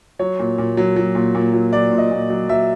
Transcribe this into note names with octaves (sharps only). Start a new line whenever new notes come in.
F#3 C#5
A#2
A#2
F#3
F#3
A#2
A#2
F#3
F#3 D5
A#2
D#5
A#2
F#3
F#3 E5